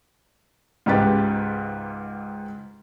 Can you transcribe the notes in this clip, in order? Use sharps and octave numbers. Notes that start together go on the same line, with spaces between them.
C#2 G#2 G4 B4 A6